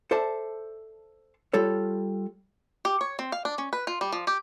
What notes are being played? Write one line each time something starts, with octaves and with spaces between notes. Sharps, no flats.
A4 C5 D5 E5 A5
G3 F4 A4 C#5
G4
C#5
C4
F5
D4
C#4
B4
F4
G3
F3
G4